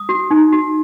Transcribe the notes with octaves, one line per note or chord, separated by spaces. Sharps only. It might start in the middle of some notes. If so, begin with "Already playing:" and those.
Already playing: D#6
F#4
D#4
F#4